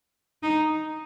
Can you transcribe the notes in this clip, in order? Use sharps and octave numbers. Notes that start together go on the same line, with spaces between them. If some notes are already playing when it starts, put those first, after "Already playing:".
D#4